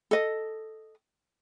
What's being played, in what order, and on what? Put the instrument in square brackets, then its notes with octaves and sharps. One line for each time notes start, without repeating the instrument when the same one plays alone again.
[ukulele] A4 D#5